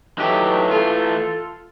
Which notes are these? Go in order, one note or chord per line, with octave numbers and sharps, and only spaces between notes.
E3 F#3 A3 D#4 G4
F4 A4